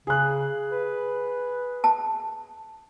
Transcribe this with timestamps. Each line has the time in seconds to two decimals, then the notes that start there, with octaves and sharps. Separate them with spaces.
0.07 C#3 G#4 F#6
0.71 B4
1.84 A5